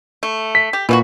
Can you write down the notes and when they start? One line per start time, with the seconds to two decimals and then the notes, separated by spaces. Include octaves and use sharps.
0.23 A3
0.55 B6
0.73 G4
0.89 A#2 E3 A3 F#4